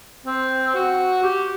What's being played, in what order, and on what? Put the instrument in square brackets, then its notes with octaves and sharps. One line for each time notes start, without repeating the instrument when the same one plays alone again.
[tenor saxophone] C4
F#4
G4